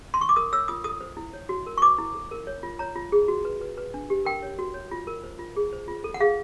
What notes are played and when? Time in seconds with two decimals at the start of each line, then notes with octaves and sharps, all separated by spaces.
0.14 C6
0.21 C#6
0.29 D6
0.36 A#4 D#6
0.52 C#5 E6
0.68 F4 D#6
0.84 A4 D#6
1.01 C5
1.17 E4
1.33 C#5
1.49 F#4
1.66 A#4
1.78 C#6
1.82 C5 D6
1.98 E4
2.14 A4
2.31 A#4
2.47 C#5
2.63 F4
2.79 C#5 A#5
2.95 F4
3.12 G#4
3.28 F#4
3.45 B4
3.61 B4
3.77 B4
3.94 D4
4.10 G4
4.25 A#4 G5
4.43 C#5
4.59 F#4
4.74 C#5
4.91 F4
5.07 A#4
5.23 C5
5.39 F4
5.56 G#4
5.73 C5
5.88 F4
6.04 A4
6.14 F#5
6.20 G#4 F5